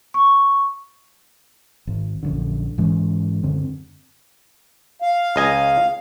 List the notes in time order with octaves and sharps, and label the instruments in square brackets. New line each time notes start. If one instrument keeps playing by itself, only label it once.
[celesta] C#6
[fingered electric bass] G#1
A#1 F#2 D3
G#2 E3 G#3 C#4
F#2 D3 C4
[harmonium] F5
[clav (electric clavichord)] C#2 D#5 G#5